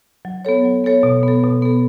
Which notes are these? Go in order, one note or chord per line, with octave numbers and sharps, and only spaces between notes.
F#3
B3 A4 C#5
F#3
B3 A4 C#5
B2
B3 A4
B2
B3 A4